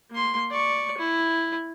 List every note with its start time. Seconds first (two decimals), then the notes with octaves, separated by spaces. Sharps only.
0.11 A#3 C6
0.51 D5 C#6
0.98 E4